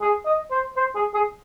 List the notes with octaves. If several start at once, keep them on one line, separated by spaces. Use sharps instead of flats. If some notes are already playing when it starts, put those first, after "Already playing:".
G#4
D#5
C5
C5
G#4
G#4